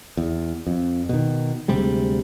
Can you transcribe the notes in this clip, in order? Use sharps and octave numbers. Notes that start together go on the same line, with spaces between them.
E2
F2
B2 D#3
D2 C3 G3 G#3